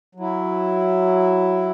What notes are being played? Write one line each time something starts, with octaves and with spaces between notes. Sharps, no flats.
F#3 E4